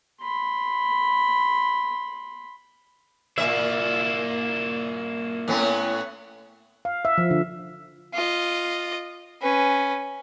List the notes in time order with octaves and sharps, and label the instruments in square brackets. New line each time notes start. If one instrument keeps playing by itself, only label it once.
[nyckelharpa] B5 C6
[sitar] A#2 E5 [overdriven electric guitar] A#3 E4
[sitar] A2 B3 C#4
[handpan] F5
E5
F3
D3
[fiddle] F4 D#5
C#4 B4